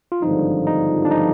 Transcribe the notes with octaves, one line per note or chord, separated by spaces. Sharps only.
F4
G#1 G2 D3 F3 D#4
D#4
D4
D#4